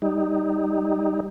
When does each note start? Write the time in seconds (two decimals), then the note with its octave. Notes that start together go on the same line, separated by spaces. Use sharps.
0.02 G3 D#4